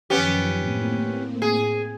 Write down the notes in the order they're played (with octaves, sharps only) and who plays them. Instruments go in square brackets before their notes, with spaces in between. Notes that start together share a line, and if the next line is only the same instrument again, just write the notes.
[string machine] F#2 D#3 F3 [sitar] B3 C#4 G4
[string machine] A2 A#3 C4
[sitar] G#4